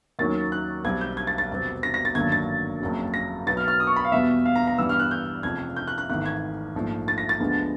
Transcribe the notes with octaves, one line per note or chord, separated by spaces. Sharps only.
D#2 D#3 F#3 A#3 C#4 A6
F#6
B1 B2 G3 C4 G#6
G6
G#6
A6
A6
F1 E2 B2 G3 C4
A#6
A#6
A6
G#1 G2 D3 F#3 A#3 G#6
A6
F#1 F2 C#3 F#3
A#6
B1 B2 F#3 B3 A6
F6
F6
D#6
C#6
B5
F5
E2 B2 G3 B3 E5
F5
A#5
A#5
G2 E3 G3 B3 E6
F6
F#6
G6
F1 F2 C#3 F3 G#6
G6
F#6
F#6
G#1 G#2 E3 A3 F#6
G#6
A#1 G#2 F3 A3
A6
A#6
A6
D2 D3 F3 G#3 B3